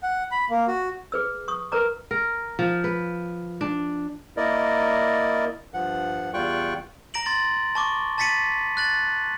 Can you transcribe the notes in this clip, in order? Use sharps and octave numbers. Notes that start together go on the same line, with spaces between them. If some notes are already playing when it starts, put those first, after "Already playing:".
F#5
B5
A#3
F#4
G#4 B4 E6
C#6 D#6
A#4 B4 A#5 D6
A#4
F3
B4
D4
A#3 E4 A#4 D5 D#5
G2 F3 F#5
E2 G3 F4 G5 C#6 F#6
A#5 A#6 D7 F#7
C6 A6 F#7
A5 C#6 D6
A5 A6 B6 C#7 D#7 F#7
F#6 A6 F#7